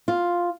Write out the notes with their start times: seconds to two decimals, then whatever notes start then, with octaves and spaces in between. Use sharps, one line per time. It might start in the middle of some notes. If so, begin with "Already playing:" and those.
0.08 F4